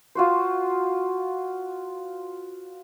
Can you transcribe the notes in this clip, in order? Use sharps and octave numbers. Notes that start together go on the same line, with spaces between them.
F4 F#4 C5